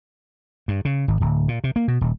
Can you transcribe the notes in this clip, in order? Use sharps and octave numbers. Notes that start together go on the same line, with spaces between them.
G2
C#3
G#1
D1
A#2
C3
A#3
B2
D#1